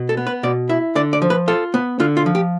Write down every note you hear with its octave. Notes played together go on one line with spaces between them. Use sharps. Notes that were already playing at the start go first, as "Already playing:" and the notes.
Already playing: B2
A4
B3
B4
B2 D5
E4 E5
D3 D5
D5
F3
B4
F4 A4
B3
D3 F4
F4
F3
G4